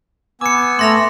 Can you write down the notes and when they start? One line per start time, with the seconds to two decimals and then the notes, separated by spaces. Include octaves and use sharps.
0.41 B3 G#5 D6 E6 C#7
0.79 A3 C6 A#6 F7